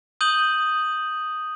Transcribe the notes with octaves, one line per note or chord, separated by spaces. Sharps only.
D#6 G6 D#7 F#7 G7